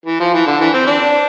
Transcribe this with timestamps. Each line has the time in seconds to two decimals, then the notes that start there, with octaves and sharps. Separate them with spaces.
0.06 E3
0.20 F3
0.34 E3
0.47 D3
0.61 E3
0.74 C4
0.87 D4